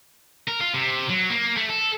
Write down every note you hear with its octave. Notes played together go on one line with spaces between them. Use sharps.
A#4
F4
C3
F#3
A#3
A3
A4